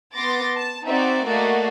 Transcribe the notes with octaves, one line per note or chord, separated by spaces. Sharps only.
B3 C6 D6 A6 A#6
A5
C4 D#4 F#4 D5 E5
A3 A#3 F#4 D5 D#5 F5